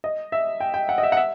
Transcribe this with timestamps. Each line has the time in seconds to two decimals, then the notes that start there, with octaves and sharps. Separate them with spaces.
0.04 D#5
0.32 E5
0.60 G5
0.74 G5
0.89 F#5
0.98 D#5
1.03 E5
1.12 F#5
1.17 E5